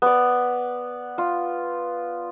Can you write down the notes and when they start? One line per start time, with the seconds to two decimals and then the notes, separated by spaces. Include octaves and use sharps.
0.02 B3 D5
1.18 F4